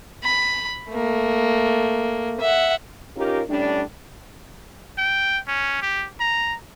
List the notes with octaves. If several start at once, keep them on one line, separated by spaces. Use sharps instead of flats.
B5
A3 A#3
E5 F#5
C#4 D#4 F4 G4 A#4
A2 G3 C#4 D4
G5
C#4
G4
A#5